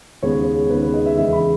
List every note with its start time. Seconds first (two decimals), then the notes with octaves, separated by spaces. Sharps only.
0.23 D#2 C#3 G#3 B3 D#4 C#5
0.70 D#2 C#3 G#3 B3 D#4 B4
0.82 B4
0.94 D#5
1.06 E5
1.17 E2 C#3 E3 G#3 E5
1.33 B5